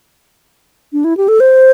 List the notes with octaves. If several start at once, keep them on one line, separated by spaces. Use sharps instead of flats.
D4
E4
G4
A4
C5